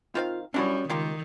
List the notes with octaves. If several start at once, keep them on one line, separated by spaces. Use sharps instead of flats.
D#3 C4 F4 F5
G3 C#4 D4 E4 F#4 G#4 C#5
C#2 D#3 A#3 F4 G4